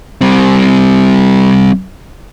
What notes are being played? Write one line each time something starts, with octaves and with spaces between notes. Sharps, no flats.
G3 C4